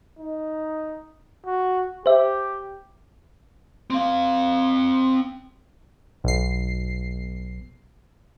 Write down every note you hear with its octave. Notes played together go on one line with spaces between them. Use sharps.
D#4
F#4
G4 C5 E5
C4 F5
B1 C7